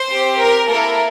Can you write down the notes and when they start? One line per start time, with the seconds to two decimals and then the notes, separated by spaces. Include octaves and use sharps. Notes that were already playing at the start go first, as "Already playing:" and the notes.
Already playing: C5
0.13 C4 G4
0.41 A#4
0.69 A#3 E4 A4 A#4